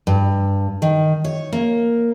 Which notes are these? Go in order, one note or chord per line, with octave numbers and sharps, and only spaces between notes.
G2
D#3
C#5
A#3